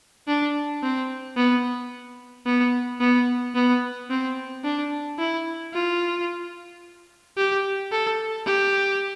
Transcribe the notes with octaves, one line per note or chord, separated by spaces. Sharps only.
D4
C4
B3
B3
B3
B3
C4
D4
E4
F4
G4
A4
G4